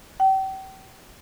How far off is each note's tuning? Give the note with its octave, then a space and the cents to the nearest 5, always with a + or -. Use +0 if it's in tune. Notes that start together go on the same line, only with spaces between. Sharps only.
G5 -35